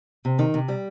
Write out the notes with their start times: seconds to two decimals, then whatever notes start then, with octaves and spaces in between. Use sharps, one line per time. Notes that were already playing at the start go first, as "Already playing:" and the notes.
0.25 C3
0.39 D#3
0.54 C3
0.68 G3